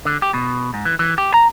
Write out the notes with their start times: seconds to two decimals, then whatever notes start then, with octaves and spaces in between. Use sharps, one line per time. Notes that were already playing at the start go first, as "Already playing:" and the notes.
0.05 D3
0.22 G4
0.34 B2
0.74 G#2
0.85 E3
0.99 E3
1.18 G4
1.34 A#5